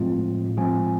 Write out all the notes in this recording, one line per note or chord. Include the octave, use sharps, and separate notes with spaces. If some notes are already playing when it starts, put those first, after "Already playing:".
Already playing: A2 F3 G#3 C4 F4
A2 F3 G#3 C4 F4 G#5